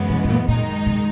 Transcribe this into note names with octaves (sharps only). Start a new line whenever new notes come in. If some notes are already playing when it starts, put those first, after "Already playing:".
Already playing: F#2 C#3 E3 G#3 B3
B2
B2
A#2
F#2 A#2 D#3 G#3 D#4
B2